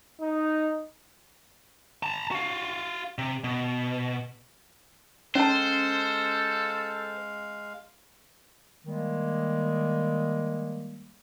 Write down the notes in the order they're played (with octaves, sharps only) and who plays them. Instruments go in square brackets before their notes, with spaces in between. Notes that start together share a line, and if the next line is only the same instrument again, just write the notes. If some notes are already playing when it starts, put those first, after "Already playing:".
[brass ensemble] D#4
[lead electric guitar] A5 A#5
F#4 F5
C3
B2
[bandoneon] G#3 F5 [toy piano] C#4 A5 [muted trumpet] A4 [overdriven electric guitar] C5
[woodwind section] D#3 G3 G#3 A#3